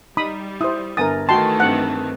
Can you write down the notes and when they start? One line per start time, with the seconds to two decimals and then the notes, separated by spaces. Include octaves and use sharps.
0.17 G3 D#4 B5 D#6
0.61 E4 C5 D#6
0.97 G1 A#4 G#5 D#6 A6
1.29 D#3 E3 A3 F#4 D#5 G5 A5 C6
1.60 G2 C4 F#5 F#6